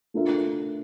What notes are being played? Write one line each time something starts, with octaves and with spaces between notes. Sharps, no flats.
A3 D4 F4 A#4 E5